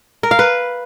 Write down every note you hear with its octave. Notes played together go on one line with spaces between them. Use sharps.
A#4
F5
B4